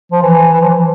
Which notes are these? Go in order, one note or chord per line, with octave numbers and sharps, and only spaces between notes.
F3
E3
E3
F3
E3